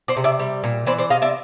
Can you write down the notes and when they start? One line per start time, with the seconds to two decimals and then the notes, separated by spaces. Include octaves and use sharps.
0.08 C5 D5
0.17 C3
0.24 D5 E5
0.39 G3
0.64 A#2
0.86 E3 C5 D5
0.98 C5 D5
1.10 C3 D#5 F5
1.22 D5 E5